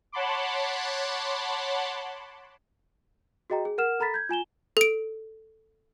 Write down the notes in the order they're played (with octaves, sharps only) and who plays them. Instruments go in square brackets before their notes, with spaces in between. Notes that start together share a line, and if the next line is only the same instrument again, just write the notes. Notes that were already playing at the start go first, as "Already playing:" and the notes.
[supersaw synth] C#5 F#5 A5 B5 C6 D6
[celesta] F#4 G#4 D#5 G5 A#5
G#4
A#4 F#5 F6 E7
A4 A#5 B5 A6 B6
G6 G#6
F4 G#5 E7 G7
[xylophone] A4 D7